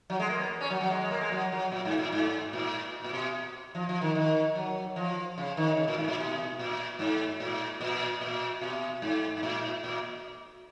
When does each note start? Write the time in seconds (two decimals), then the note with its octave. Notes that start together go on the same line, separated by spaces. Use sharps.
0.10 F#3
0.20 G#3
0.30 A#3
0.40 B3
0.61 C#4
0.70 F#3
0.81 F#3
0.90 G#3
1.01 G#3
1.11 A#3
1.21 G#3
1.32 F#3
1.52 F#3
1.72 A#2
1.85 G#2
1.99 A#2
2.12 G#2
2.53 A#2
3.04 A#2
3.13 B2
3.75 F3
3.89 F3
4.02 D#3
4.15 D#3
4.55 F#3
4.96 F3
5.38 C#3
5.57 D#3
5.77 C#3
5.88 A#2
5.98 G#2
6.08 A#2
6.18 B2
6.59 A#2
6.99 G#2
7.40 A#2
7.81 A#2
8.21 A#2
8.61 B2
9.02 G#2
9.37 G#2
9.43 A#2
9.84 A#2